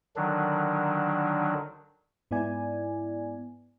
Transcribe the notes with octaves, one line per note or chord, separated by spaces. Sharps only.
D3 D#3 F#3 D4
G#2 B3 E4 D5 G#5